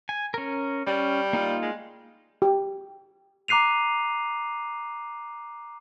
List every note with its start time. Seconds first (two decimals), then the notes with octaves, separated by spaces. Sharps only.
0.09 G#5
0.34 C#4 A#4
0.87 G3 C#4
1.33 A#3 D#4 F4
1.62 G#3
2.42 G4
3.48 A#5 D6 F#6 C7 D#7 F7